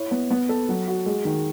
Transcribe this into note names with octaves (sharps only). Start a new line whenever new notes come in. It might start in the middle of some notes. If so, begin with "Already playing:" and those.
Already playing: E4 C#5
B3
B3
A4
F#3
F#4
G#3
D#3